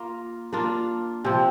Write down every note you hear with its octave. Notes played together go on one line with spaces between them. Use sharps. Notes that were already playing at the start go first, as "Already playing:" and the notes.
Already playing: A#3 F4 A#4
A#3 D4 F4
C3 F3 C4